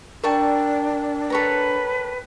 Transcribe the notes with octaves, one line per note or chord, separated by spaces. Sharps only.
D4 A#4 D5 G5 A5 C#6
A4 B4 C#5 A#5